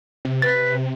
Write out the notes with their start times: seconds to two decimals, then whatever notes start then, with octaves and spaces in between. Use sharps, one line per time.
0.25 C3
0.42 B4 A6